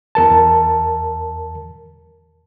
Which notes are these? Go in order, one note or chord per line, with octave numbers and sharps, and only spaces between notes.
E2 A#4 A5